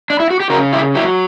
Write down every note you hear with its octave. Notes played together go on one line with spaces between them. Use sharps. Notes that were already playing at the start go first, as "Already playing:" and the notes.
D4
E4
F#4
G4
C#3 F#4 A#4
E4 G4
F#3 E4 G4